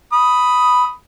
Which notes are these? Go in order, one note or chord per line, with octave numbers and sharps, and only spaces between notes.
B5 D#6